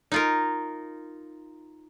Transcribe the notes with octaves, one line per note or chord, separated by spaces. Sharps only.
D#4 F4 A#4